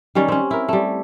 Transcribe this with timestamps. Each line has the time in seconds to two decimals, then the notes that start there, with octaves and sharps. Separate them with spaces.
0.15 D#3 G3 C#4 C#5
0.28 C4 C#4
0.51 E4 A#4
0.69 G3 A3